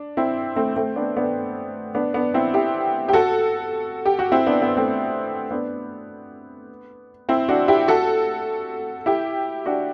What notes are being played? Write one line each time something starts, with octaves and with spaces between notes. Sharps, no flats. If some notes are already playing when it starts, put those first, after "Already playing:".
Already playing: D4
C4 E4
A3 C4
A3 C4
B3 D4
B3 D4
B3 D4
B3 D4
C4 E4
E4 G4
G4
F#4 A4
G4
F#4
C4 E4
B3 D4
B3
A3 C4
B3 D4
C4 E4
D4 F#4
E4 G4
F#4 A4
E4 G4
D4 F#4